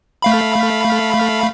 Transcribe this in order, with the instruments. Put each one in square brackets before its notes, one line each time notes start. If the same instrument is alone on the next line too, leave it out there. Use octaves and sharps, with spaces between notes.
[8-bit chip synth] A3 F5 B5